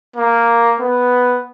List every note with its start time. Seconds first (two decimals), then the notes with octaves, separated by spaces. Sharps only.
0.16 A#3
0.80 B3